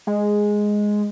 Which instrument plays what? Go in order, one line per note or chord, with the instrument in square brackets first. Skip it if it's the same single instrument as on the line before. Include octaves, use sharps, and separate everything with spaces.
[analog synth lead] G#3